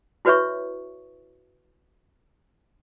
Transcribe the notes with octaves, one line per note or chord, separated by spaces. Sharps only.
E4 F#4 B4 C#5 E5 C#6